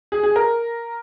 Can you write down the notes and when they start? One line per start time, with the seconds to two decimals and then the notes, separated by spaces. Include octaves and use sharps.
0.12 G#4
0.23 G#4
0.36 A#4